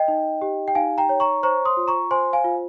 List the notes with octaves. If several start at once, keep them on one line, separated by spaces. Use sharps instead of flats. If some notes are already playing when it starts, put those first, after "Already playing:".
Already playing: D#5 G5
D#4
G4
G5
D#4 F5 G#5
G5 A#5
C#5
A#5 C#6
C5 A#5 C#6
C6 D#6
F4
A#5 C#6
C5 G#5 C6
F5 G#5
F4